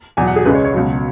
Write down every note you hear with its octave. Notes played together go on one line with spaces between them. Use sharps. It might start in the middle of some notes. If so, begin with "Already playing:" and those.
E2 B2 F#3 G#5
F#5
G#4
C#2 C#3 G#3 B4
C#5
C#5
C#2 B2 F#3